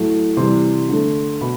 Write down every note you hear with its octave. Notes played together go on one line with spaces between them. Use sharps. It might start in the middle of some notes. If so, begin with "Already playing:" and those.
Already playing: A2 F#3 A3
C3 E3 G3 C6
D3 A3
B2 B5